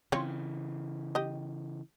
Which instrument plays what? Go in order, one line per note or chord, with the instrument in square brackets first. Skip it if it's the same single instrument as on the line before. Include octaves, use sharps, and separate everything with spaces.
[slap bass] C#3 E3 [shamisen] C4 F4 C#5
[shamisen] G4 D#5